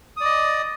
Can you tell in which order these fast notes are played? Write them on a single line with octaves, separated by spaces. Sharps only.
D#6 D5 D#5